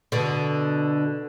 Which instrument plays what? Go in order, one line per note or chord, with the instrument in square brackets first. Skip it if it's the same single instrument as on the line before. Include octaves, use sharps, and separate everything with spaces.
[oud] B2 D3